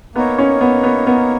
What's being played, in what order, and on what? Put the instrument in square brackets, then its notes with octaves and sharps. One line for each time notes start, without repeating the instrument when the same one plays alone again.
[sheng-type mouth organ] A#3 D#4 A#4 C#5 [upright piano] B3
[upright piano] C#4
B3
B3
B3